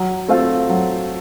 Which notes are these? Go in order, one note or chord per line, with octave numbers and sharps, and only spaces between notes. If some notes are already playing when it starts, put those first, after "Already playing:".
Already playing: F#3
A3 C4 F4 A4
F#3